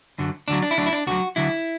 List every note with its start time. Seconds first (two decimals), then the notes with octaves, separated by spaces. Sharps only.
0.18 F#2 D3 F#3
0.48 D2 D3 F#3 D4
0.62 D4
0.71 E4
0.78 D2 D3 F#3 D4
0.86 E4
0.93 D4
1.07 D2 D3 F#3 F#4
1.36 D2 D3 F#3 E4